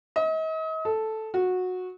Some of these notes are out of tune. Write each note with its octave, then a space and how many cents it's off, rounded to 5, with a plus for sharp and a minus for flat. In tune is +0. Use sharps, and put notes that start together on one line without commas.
D#5 +40
A4 -5
F#4 -15